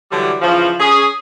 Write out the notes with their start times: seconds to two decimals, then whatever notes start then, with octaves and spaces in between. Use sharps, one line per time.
0.11 D3 E3 F#3 G3
0.42 C#3 E3 F3
0.80 C#4 G#4